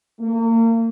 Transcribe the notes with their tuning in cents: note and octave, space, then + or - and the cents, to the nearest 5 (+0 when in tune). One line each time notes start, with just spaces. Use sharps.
A#3 -35